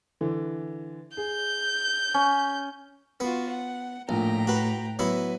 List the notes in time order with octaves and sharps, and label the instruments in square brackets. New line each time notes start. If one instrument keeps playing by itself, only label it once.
[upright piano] D3 E3
[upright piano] G#4 [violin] G6
[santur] C#4
[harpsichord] B3 [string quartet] F4 F#4
[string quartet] F#5
[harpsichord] A#1 [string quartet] A2 G5 A#5
[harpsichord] F#4 B4
[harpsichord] F#3 B3 E4 [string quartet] B4